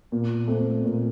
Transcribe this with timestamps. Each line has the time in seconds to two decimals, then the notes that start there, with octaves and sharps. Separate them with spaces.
0.12 A#2
0.48 A3 C4
0.85 A#2